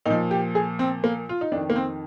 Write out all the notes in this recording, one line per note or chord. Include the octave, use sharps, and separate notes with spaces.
A#2 F3 D#4
G4
G#4
C4
A#3
F4
D#4
F2 D#3 D4
A#3
C4